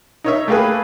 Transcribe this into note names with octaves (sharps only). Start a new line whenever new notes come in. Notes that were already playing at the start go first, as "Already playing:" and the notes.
D#4 C#5 E5
A3 A#3 G4 G#4 B4